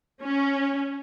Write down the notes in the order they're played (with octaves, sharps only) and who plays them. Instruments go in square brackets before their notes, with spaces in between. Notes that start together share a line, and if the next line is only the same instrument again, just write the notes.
[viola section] C#4